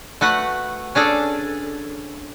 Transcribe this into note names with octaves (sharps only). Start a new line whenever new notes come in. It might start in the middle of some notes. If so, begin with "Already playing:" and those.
A3 F#4 B4 F#5
C#4 D4 G#4 A4